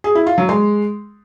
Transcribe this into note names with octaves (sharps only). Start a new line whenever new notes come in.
G#4
E4
F4
F#3
G#3